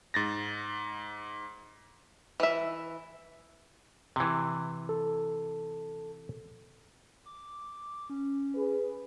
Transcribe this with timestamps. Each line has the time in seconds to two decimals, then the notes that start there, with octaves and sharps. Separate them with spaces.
0.14 G#2 A6 A#6
2.40 E3 E5
4.16 C3 E3
4.89 A4
7.26 D6
8.10 C#4
8.55 G#4 B4